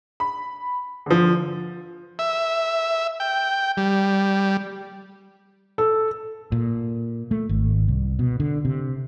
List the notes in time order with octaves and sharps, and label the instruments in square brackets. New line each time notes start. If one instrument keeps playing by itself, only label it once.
[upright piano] B5
D3 F3
[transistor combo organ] E5
G5
G3
[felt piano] A4
[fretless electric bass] A#2
A3
G#1
C2
B2
D3
C3